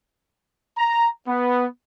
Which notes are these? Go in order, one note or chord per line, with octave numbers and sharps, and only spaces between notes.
A#5
B3